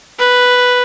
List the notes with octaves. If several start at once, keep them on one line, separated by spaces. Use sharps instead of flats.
B4